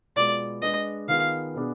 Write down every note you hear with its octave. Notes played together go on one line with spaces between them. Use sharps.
B2 G#3 B3 F4 D5
G#3 D4 G#4 B4 D#5
D#3 B3 F4 G#4 F5
B2 B3 D4 G#4